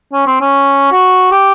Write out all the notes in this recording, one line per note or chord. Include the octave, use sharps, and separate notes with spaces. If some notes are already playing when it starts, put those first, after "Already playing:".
C#4
C4
C#4
F#4
G4